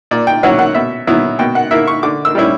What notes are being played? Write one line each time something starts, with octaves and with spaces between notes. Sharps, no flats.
A#2 D5
G5
F#3 C#4 E4 F#5
F#5
B2 E5
F#3 B3 E4
B2 G5
F#5
A#3 E4 E5
C#6
D3 D6
E6
G3 C#4 E4